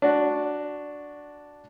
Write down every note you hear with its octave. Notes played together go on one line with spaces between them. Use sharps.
D4 F#4